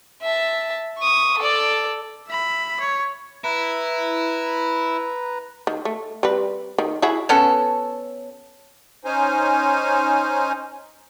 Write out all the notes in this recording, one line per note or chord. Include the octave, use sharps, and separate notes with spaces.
E5 A5
C#6 D#6
A4 D5
E5 B5
C#5
E4 B4 A#5
D#3
A3
G3 C4 B4
D#3
E4 F#4 G#4
B3 C#4 F#4 A4
C#4 D#4 C5 G#5